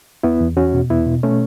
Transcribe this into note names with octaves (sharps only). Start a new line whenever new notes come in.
E2 B3 E4
E2
E2 C#4 F#4
B2
E2 B3 E4
B2
B2 A3 C#4